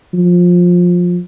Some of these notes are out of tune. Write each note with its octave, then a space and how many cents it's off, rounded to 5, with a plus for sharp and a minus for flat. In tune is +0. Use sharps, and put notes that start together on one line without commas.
F3 +20